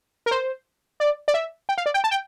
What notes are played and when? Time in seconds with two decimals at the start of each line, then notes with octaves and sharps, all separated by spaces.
0.26 A#4
0.31 C5
1.00 D5
1.28 D5
1.34 E5
1.69 G5
1.78 F5
1.86 D5
1.94 G5
2.04 A5
2.11 G5